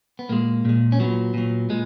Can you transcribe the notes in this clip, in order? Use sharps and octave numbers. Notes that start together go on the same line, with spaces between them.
B3
A#2 G#3 A#3
A#2 G#3
C#4
A#2 F#3 B3
A#2 F#3
A#2 G#3